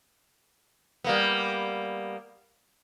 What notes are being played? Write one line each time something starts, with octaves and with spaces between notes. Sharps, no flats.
G3 A#3 B3